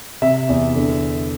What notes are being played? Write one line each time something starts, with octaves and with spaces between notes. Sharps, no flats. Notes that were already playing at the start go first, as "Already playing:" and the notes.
C3 E5
E2
D3